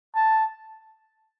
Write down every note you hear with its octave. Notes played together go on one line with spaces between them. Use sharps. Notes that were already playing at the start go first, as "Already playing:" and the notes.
A5